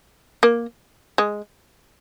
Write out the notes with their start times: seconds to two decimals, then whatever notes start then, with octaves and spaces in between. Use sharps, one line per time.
0.43 A#3
1.18 G#3